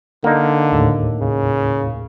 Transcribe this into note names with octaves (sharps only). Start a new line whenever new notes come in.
D3 A#3 D#4
D#2 A2
C#3